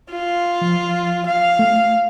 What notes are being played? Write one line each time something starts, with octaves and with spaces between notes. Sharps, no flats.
F4
F3
F5
A3